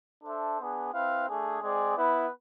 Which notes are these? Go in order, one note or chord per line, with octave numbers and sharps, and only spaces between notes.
D4 A4 C5 E5
B3 D4 G#4
C4 E4 B4 F5
A3 D4 G#4
G#3 C4 G#4 D5
B3 E4 B4